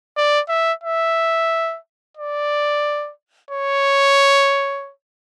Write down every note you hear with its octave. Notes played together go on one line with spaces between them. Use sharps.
D5
E5
E5
D5
C#5